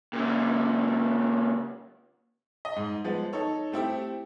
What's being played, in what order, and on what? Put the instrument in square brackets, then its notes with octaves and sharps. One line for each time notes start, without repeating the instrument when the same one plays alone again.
[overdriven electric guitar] A#2 C#3
[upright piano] D#5
G#2
F3 G#3 B3
D#4 A4 C#5
A3 C4 E4 G4